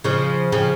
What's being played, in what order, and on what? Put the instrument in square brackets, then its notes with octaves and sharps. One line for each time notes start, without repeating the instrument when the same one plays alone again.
[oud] C#3 F3
C#3 F3